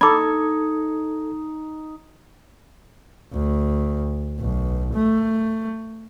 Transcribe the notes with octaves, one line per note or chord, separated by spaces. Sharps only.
D#4 A4 B5 D6 G#6
D2
B1
A3